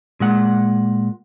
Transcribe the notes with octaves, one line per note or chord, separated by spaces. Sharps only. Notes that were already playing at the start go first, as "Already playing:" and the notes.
A#2 G#3 F#5